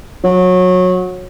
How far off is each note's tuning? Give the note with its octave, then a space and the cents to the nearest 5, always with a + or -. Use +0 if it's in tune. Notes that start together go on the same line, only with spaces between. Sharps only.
F#3 -20